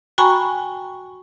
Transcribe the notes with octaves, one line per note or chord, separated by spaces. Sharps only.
F#4 G5 G#5 A#5 B5 C#6